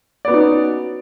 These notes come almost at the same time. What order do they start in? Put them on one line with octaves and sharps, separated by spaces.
D5 B3 F#4 D#4 C#4